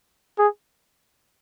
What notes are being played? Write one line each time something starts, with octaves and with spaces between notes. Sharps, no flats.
G#4